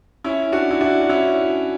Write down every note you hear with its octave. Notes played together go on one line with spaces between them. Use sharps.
C#4 E4
D4 F#4
E4
D4 F#4
F#4
C#4 E4